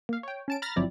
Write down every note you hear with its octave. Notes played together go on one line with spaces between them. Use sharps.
A#3 F5
C#5 G5
C#4 A5 D7
A#5 B5 F6 A6 A#6
G1 F3 F#3 C4 E4 D5